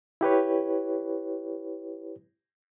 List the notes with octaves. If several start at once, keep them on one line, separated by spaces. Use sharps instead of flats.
E4 G4 B4 C#5